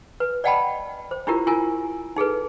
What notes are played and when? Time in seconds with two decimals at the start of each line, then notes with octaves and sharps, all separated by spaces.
0.20 B4
0.44 D5 D#5 F#5 G5 A5 B5
1.11 C5
1.27 D4 E4 F4 G4 A#4
1.47 E4 F4 A#4 G#5
2.16 D#4 G#4 A4 B4